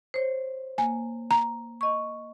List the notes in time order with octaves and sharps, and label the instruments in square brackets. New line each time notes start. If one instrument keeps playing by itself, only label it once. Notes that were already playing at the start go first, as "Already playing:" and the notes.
[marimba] C5 C#5
[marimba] A#3 [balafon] G#5
[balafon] A#5
[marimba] D#5 C#6